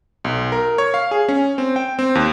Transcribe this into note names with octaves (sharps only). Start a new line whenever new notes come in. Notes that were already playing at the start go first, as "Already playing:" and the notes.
B1
A#4
C#5
F5
G#4
C#4
C4
G5
C4
D#2